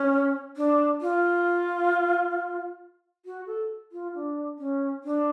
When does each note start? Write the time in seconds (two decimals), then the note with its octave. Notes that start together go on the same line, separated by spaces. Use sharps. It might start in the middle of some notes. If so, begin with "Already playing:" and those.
Already playing: C#4
0.57 D4
1.01 F4
3.26 F#4
3.47 A4
3.92 F4
4.15 D4
4.59 C#4
5.04 D4